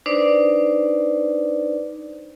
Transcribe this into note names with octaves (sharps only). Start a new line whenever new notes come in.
D4 D#4 B4 C5 D5